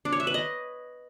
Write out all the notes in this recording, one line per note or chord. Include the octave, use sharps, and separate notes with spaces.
D4
C#5
E5
B4
D#5